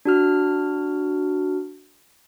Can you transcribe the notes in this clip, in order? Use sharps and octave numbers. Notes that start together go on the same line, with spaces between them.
D4 F#4 F6